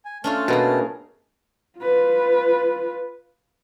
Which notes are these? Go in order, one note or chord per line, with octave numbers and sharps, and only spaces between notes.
G#5
A3 C#4 D4 F4 A5
B2 A#3 B3 G#4
F4 B4